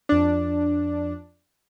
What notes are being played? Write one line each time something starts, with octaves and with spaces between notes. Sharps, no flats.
F2 D4